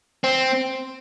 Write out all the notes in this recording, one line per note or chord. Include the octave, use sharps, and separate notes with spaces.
C4